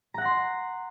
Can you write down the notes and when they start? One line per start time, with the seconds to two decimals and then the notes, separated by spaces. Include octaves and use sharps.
0.14 A#5
0.18 F#5
0.22 A#6
0.25 C6